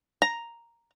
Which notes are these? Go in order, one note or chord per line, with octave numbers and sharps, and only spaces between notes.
A#5